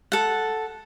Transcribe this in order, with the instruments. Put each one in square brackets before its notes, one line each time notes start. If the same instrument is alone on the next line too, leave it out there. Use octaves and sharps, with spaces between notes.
[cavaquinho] A4 F#5